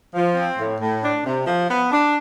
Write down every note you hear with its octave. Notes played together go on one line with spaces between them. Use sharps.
F3
C4
A2
A2
D4
C3
F3
B3
D4